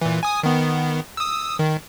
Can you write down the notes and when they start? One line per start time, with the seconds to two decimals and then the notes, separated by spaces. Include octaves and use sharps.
0.01 A#2 E3
0.23 G#5 D#6
0.43 D#3 B3
1.17 D#6 E6
1.59 D#3